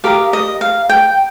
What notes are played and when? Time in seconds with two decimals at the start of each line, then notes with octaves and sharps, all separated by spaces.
0.04 G4 A#4 D#5 F5
0.33 D#5
0.61 F5
0.89 G5